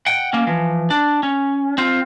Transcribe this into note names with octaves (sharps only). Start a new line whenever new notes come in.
F#5 G5
A#3 C#4
E3 F3
D4
C#4
C4 F4